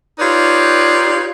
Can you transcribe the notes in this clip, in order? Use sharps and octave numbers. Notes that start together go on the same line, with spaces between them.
D#4 F4 G4 B4 C#5 D5